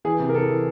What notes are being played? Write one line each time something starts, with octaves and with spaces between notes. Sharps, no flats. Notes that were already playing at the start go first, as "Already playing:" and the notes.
E3 G#4
C3
A#4
E3 A4
E3